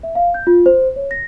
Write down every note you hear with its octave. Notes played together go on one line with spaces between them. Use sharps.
E5
F5
G6
F4
C5
C#5
A#6